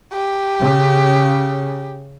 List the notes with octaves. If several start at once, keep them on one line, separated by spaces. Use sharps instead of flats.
G4
C#3